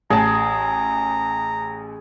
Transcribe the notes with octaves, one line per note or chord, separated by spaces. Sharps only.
A1 G#4 A5 A#5